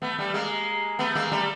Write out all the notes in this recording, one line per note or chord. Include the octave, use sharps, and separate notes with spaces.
A3 B3
G3 A3
G#3 A#3
A3 B3
G#3 A#3
G3 A3